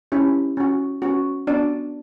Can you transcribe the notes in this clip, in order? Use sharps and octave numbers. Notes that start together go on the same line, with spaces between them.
C#4 E4 G4
C#4 F#4
C#4 F#4
B3 D4 F#4 D5